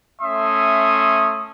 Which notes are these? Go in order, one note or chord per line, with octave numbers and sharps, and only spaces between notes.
A3 C#4 E5 C6 D#6